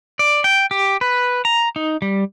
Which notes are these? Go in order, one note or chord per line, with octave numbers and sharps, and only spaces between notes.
D5
G5
G4
B4
A#5
D#4
G3